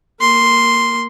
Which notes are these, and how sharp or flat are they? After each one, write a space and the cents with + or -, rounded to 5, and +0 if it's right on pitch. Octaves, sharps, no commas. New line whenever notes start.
A#3 +0 C6 +0